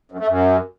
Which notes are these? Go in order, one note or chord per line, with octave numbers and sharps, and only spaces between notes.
F#2
A3
F#2